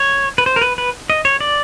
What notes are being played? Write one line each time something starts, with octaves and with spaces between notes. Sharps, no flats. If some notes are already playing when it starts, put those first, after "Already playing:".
Already playing: C#5
B4
C5
A#4
B4
B4
D#5
C#5
D5